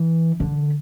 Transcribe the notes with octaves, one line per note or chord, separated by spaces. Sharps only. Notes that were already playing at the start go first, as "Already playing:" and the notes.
Already playing: E3
D3